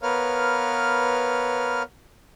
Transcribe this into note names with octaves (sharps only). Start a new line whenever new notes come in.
B3 A#4 B4 C#5 F5 F6